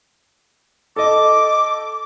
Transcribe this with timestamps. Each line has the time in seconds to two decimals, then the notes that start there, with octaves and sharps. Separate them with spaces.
0.96 A4 D#5 D6